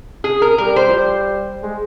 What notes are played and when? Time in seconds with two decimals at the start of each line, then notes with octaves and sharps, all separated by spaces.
0.24 G#4
0.42 A#4
0.58 G3 A#4
0.76 C5
0.89 F3
0.93 G3
1.63 G#3